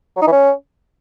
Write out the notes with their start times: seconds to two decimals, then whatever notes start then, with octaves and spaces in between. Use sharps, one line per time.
0.16 F#3
0.22 D#4
0.27 E3
0.32 C#4